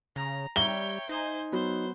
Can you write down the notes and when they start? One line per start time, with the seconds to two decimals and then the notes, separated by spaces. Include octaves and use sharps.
0.16 C#3 A#5
0.56 G3 C#5 E5 G5 A#5 G7
1.09 D#4 C5 G#5
1.52 F#3 B3 C5